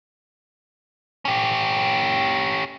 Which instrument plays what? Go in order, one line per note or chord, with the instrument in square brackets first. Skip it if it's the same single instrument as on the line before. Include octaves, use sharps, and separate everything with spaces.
[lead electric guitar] C#4 G4